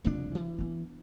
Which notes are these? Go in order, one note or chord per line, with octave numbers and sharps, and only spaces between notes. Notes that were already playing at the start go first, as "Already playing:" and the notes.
C2 F2 C#3 F3 D4
E3
B3 D4